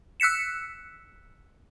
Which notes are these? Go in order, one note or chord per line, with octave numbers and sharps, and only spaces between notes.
E6 F#6 B6 C#7 E7